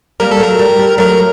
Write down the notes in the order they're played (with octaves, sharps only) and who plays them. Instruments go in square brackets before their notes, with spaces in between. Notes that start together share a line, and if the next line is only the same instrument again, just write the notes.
[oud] G3 A#3 [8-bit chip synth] A#4
[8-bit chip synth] A4
[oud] F#3 A3 [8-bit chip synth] A#4
[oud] G3
G3
[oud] F#3 A3 [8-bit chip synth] A#4